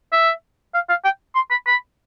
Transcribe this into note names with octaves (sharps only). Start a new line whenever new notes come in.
E5
F5
F5
G5
C6
B5
B5